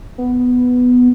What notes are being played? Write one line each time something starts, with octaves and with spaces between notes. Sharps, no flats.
B3